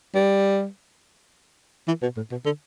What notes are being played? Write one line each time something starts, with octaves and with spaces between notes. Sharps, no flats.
G3
E3
B2
A2
B2
D3